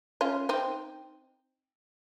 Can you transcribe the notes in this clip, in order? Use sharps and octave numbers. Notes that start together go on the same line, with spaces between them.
C#4 F4
C4 D#4